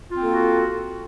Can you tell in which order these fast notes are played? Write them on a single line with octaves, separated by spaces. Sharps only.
F4 C4 A#3 A4 F#4